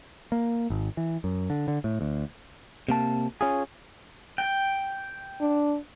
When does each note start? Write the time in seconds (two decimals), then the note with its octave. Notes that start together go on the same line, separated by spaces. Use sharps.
0.32 A#3
0.70 G#1
0.97 E3
1.24 F#2
1.50 D3
1.68 D3
1.84 A2
2.01 D2
2.89 C3 A#3 A5
3.41 C#4 F4 G#4
4.38 G5
5.41 D4